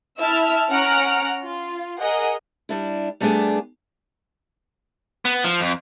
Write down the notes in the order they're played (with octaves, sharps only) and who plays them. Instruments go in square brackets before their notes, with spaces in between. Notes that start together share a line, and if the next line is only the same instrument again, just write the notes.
[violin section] E4 E5 A5 E6 F6
C#4 F#5 A#5 F6 D7
F4
G#4 A#4 D#5 F#5
[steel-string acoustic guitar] G3 D4 E4
G3 A3 B3 D4 G#4
[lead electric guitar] B3
F3
F2